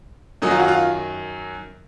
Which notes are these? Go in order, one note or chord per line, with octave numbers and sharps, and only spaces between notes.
F#2 D#3 F#3 D#4
F4
F#4
F4